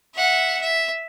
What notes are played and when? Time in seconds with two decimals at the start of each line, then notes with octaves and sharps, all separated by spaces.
0.14 E5 F#5
0.61 E5